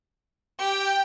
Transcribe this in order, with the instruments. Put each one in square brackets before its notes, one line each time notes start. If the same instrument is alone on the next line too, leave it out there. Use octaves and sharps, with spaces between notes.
[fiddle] G4 [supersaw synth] G5